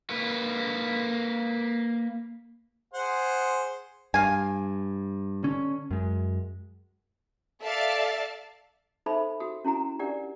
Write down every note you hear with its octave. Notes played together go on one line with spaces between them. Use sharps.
A#3 B4
G#4 C5 F#5
G2 F5 G#5
D3 C#4
F#2 G#3
A4 D5 E5 F5 A5 A6
D#4 A4 C5 E5 B5
F#4 D#6
C#4 E4 F#4 A#5
D4 G4 A#4 D5 F#5